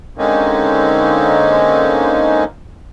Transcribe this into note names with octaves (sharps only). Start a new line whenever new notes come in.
D3 G#3 A#3 C4 C#4 D#4